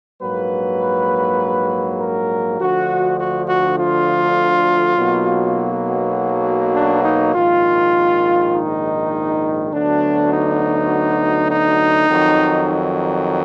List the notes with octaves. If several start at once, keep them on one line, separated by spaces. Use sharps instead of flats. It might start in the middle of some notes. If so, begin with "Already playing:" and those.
A#1 G#2 F#3 A#3 B4
A#4
D2 D3 F3 F#4
F#4
F#4
F4
B1 B2 F#3 A#3
D4
D#4
A#1 G#2 D#3 F4
D#4
D2 D3 F#3 B3 D4
D#4
D#4
F2 D#3 F#3